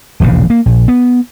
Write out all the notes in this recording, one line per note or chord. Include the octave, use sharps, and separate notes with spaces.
E1 A#1 D#2 C#3
A#3
A#1
B3